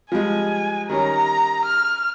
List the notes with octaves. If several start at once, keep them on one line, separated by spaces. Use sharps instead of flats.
F3 G3 G#3 G#5
D#3 G3 C#4 A#5
F6